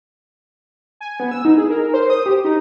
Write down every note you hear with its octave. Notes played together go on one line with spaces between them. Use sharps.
G#5
B3
E6
D#4
G#4
A#4
A#4
C5
D#6
G4
D#4